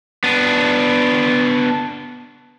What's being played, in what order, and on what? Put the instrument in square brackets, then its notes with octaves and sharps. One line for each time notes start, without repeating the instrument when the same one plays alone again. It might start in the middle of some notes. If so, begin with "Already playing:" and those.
[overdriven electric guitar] B3 D4